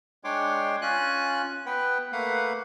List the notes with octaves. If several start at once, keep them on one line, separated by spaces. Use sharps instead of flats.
G#3 D4 C#5 G5 C6 D6
C#4 F4 G#5 F#6
B3 B4 F#5 G5
A3 A#3 B4 F5 F#5